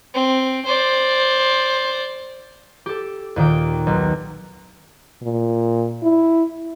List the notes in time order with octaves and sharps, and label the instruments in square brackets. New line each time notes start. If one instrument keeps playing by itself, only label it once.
[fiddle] C4
C5 D5
[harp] G4 A4
D#2 A#2 D#3 G5
B1
[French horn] A#2
E4